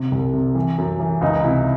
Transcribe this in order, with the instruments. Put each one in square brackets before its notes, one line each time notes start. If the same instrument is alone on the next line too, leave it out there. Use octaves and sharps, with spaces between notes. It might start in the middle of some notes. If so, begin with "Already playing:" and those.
Already playing: [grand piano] C3
C2
C3
E3
F#2
E3
C#2 D#4
C3 E4